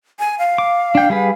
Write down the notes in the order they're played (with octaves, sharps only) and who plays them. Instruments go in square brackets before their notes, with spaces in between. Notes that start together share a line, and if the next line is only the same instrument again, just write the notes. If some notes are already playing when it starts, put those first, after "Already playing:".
[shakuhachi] G#5
F5
[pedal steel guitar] D6
D4 G5
G3 G#4 B4